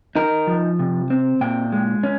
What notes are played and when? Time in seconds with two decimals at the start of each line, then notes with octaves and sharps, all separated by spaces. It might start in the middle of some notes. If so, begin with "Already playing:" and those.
0.16 D#4 A#4
0.47 F3
0.79 C3
1.10 C4
1.41 A#2 G5
1.72 G#3
2.03 C#4